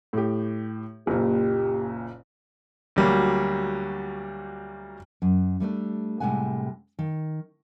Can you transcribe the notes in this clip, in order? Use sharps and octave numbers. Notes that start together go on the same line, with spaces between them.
A2 G4
F#1 A#2 G4
D2 F#3 G3 A#3
F#2
G3 A3 C4 D4
A2 C3 G3 G#3 F#5 G#5
D#3